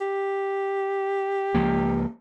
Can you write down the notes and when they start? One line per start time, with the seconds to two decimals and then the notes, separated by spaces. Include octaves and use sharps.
0.01 G4
1.54 C#2 F3 A#3